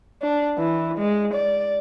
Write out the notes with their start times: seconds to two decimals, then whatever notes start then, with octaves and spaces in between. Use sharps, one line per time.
0.22 D4
0.58 E3
0.98 G#3
1.34 D5